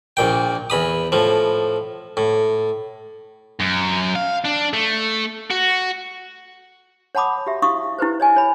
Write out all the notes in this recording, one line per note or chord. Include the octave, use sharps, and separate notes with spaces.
A#1 A#2 G5
E2 B5 D#6
A2 F3
A2
F#2
F5
D4
A3
F#4
C#5 F#5 A5 B5 D6 D#6
F#4 G4 E5
E4 F#4 G4 F5 C#6 D#6
E4 G4 B4 C5
C#5 D#5 G#5
C#5 B5